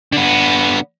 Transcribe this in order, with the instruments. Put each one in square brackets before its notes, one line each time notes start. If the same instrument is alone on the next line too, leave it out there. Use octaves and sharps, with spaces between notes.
[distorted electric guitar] D3 B3